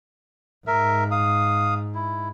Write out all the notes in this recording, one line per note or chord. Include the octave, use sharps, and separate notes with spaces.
G#2 A#4 E5
F5 D#6
E4